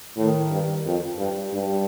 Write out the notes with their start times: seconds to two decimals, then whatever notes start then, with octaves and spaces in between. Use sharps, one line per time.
0.17 A2 D#3
0.51 G2
0.86 F2
1.19 G2
1.53 G2